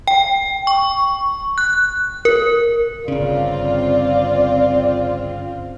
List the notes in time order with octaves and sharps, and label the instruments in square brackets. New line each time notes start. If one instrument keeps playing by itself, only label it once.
[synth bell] G5
C#6
F#6
A#4
[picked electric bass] G1 C#3 [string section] C4 F4 [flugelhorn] D5